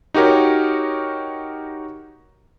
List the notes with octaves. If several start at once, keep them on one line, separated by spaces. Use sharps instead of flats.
D#4 F#4 G4 A#4 C#5